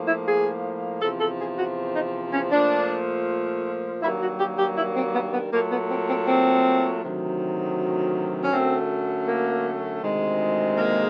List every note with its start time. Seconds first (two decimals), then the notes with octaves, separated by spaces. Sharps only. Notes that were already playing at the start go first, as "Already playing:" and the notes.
Already playing: A2 F3 A#3
0.08 E4
0.27 G#4
1.02 E2 C3 F3 A4
1.21 A4
1.40 G#4
1.58 F#4
1.96 D#4
2.33 C#4
2.52 A#2 F3 A3 D4
4.02 G2 D#3 F#3 A#3 E4
4.21 F#4
4.40 G4
4.59 G4
4.78 E4
4.96 C4
5.15 B3
5.33 B3
5.53 A#2 F#3 A3 A#3
5.71 B3
5.91 C4
6.09 C4
6.28 C4
7.03 D2 C3 D#3 F#3
8.41 C#4
8.53 F#2 D3 F#3 A3 C4
9.28 A#3
10.03 D2 C3 D#3 G#3
10.78 A#3